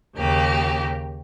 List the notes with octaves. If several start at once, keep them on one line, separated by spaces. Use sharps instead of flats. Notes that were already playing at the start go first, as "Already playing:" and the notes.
D#2 C#3 A#3 G4